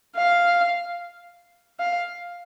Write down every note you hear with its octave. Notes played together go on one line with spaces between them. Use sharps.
F5
F5